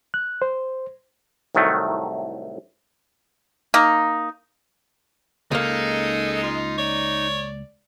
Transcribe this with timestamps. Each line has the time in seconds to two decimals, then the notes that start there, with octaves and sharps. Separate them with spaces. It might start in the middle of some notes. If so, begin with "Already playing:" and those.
0.14 F#6
0.42 C5
1.55 C2 A2 D#3 F#3 A3
3.74 A#3 D#4
5.51 C#2 G#3 A#3 D#4 A4
6.43 F4
6.78 C#5 D5